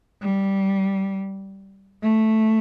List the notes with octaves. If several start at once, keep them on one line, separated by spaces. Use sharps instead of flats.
G3
A3